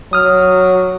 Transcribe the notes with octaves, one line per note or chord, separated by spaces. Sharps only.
F#3 D#6 F6